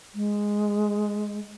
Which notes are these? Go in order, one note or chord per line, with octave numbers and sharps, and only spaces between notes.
G#3